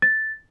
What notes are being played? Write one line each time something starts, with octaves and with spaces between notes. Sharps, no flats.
A6